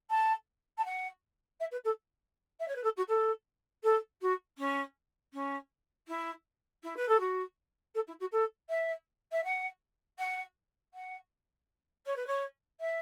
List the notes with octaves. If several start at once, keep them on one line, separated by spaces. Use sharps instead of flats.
A5
A5
F#5
E5
B4
A4
E5
C#5
B4
A4
F#4
A4
A4
F#4
C#4
C#4
E4
E4
B4
A4
F#4
A4
E4
F#4
A4
E5
E5
F#5
F#5
F#5
C#5
B4
C#5
E5